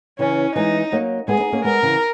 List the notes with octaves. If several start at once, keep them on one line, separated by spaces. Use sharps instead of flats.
C#3 E3 C#4
E3 G#3 D#4
F#3 A#3
G#3 B3 G#4
B3 D#4
A#3 C#4
G#3 B3 A#4
C#3 E3